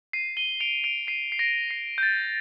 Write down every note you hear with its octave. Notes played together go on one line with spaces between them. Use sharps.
C7 D#7
D#7 G7
D7 F7
D7 F7
C7 D#7
C7
A#6 D7
C7
G6
A6